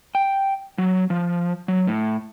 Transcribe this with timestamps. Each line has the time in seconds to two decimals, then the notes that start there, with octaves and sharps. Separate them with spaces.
0.15 G5
0.78 F#3
1.10 F3
1.68 F#3
1.87 A2